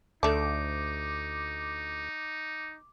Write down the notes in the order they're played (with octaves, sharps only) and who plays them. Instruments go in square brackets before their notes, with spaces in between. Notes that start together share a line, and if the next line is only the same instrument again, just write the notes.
[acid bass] D2 [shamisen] A3 D4 [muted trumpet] D#4 [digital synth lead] D6